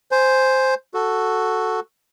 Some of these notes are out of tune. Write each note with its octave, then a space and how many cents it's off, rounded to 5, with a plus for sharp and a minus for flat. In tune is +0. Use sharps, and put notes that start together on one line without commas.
C5 +0 G#5 +0
F#4 +0 A4 +0